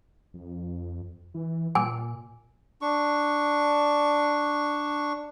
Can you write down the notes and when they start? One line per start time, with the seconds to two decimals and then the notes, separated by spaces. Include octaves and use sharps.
0.34 F2
1.34 E3
1.75 A#2 G#5
2.82 D4 C#6